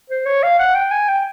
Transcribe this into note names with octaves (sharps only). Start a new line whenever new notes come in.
C5
C#5
F5
F#5
G5
G#5
G5